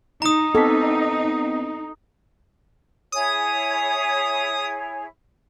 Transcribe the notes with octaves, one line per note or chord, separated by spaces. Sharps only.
D#4 A#5 D#6
B3 C4 A4 B6
E4 G#4 C#5 D#6